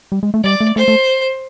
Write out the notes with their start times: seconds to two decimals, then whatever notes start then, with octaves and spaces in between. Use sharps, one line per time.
0.12 G3
0.23 G#3
0.34 A3
0.44 G3 D5
0.61 A3
0.76 A3 C5
0.88 A3